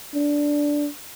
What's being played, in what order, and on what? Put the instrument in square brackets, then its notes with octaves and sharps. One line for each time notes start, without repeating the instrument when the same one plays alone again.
[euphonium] D4